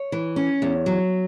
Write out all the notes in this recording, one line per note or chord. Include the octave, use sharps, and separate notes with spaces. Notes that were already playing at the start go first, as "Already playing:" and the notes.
Already playing: C#5
E3
C#4
E2
F#3